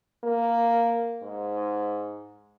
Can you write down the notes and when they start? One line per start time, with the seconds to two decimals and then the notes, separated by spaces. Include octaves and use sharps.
0.24 A#3
1.22 G#2